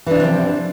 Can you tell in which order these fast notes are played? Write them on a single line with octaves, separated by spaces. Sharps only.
E3 D4 C3 C4 F3